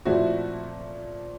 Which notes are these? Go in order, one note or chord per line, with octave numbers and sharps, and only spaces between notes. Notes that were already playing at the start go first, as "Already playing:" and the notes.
A#2 F3 A3 C4 E4 F#4